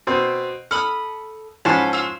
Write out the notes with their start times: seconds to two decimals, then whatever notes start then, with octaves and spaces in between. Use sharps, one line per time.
0.07 B2 C4
0.71 A4 B5 D#6 F6
1.65 G#2 F3 C#4 A4 B5
1.93 F4 E6